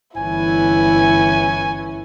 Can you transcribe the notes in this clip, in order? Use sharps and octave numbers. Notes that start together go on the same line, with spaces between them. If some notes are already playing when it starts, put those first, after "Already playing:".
G1 E3 C#4 E4 G#5